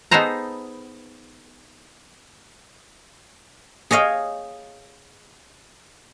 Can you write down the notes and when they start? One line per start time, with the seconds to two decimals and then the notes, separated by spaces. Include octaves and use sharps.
0.11 B3 D#4 G#4 A4 C5 A#5
3.91 G#4 C#5 D#5 F5 G5